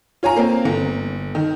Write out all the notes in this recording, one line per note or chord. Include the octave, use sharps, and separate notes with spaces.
F4 C#5 G#5 A#5
A#3 C4
G1
D#3